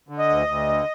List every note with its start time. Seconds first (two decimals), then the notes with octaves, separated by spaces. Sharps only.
0.09 D3
0.18 D#5
0.29 D2
0.48 D2
0.68 D3